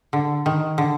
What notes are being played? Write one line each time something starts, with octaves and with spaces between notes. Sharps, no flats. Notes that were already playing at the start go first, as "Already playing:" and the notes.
D3
D#3
D3